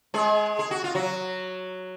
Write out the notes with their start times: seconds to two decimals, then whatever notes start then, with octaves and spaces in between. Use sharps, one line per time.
0.14 G#3 G#4
0.59 G#4
0.71 F#4
0.84 F4
0.95 F#3 F#4